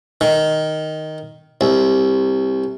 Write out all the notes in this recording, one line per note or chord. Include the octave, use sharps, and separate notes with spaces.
D#3
C2